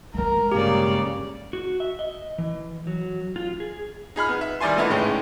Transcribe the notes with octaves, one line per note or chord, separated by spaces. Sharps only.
E3 G#3 A#4
G2 C#3 A#3 G4 D5
F#4
E5
D#5
E3
F#3
F4
G#4
D#4 G#4 B5 F6
B3
E5
D#3 G3 E4 D5 G#5 C6
D3 E3 A3 B3 D#4 E4
A1 A2 C#3 G#3 C#4 G5